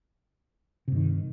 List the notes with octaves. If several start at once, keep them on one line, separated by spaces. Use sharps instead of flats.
G2 C3 D#3